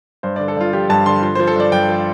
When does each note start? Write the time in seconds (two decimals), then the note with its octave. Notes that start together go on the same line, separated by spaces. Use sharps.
0.23 G2 C5
0.36 D3 D5
0.48 A4
0.57 G2 F4
0.73 F3 G4
0.89 G2 A5
1.06 D3 C6
1.23 F3 C6
1.35 F3 C5
1.47 A4
1.56 G2 D5
1.72 G2 G5
1.89 F3